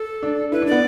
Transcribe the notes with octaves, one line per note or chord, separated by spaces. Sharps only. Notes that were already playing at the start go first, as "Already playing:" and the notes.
Already playing: A4
D4
E4 B4
D4
B3 D5